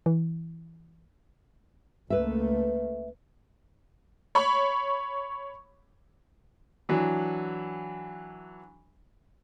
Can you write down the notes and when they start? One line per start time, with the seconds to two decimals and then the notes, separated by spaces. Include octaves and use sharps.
0.06 E3
2.10 C#2 A3 A#3 B4 E5
4.35 C#5 B5 C#6
6.89 E3 F#3 D4